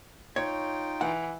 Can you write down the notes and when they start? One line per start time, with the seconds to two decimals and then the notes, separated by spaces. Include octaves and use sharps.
0.36 D#4 F4 C#5 G5
1.01 E3 F#5